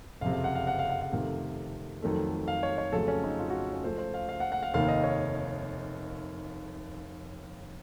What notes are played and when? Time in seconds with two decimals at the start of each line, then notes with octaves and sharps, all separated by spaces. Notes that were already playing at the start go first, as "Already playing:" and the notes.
0.21 F#1 F2 C3 F5
0.33 F5
0.44 F#5
0.55 F5
0.67 F#5
0.79 F5
0.89 F#5
1.01 F5
1.12 F2 C3 D#3 A3 F5
2.02 F2 D#3 F#3 A3
2.48 F5
2.63 C#5
2.78 C#5
2.93 F2 C#3 F#3 A3 A4
3.08 C#4
3.24 D#4
3.39 F4
3.50 F#4
3.73 C#4
3.84 C#2 C#3 F3 A3 C5
3.98 C5
4.14 F5
4.29 F5
4.40 F#5
4.52 F#5
4.63 F5
4.74 F1 D#2 D#3 F5
4.88 D#5
5.04 C#5